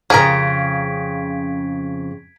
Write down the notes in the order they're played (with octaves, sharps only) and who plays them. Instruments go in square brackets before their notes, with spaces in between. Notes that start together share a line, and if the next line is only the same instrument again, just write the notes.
[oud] F2 C#3 [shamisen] G#4 A#4 [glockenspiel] G#6 B6 D7